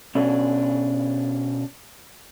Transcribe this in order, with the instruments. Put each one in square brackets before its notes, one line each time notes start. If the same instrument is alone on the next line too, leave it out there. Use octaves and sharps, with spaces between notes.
[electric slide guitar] B2 C#4 D4